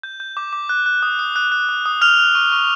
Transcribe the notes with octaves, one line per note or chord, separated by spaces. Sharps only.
G6
G6
D6
D6
F#6
F#6
D#6
D#6
F#6
F#6
D#6
D#6
F6 F#6 F7
F#6
C#6
C#6